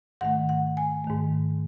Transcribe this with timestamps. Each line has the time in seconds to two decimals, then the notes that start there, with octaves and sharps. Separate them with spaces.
0.21 G#2 D#3 A3 F#5
0.49 F#5
0.77 G#5
1.04 G#2 D#3 A3